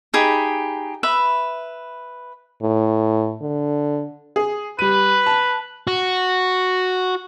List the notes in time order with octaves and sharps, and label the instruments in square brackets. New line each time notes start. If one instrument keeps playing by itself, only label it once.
[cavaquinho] D#4 G4 G#4 B5
B4 E5 B5
[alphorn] A2
D3
[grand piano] G#4
[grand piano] G3 D#7 [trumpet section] B4
[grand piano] A5
[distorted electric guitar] F#4